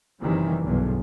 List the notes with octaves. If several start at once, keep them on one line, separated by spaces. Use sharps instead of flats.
F#1 C3 D#3 E3 G3
B1 E2 G2 D3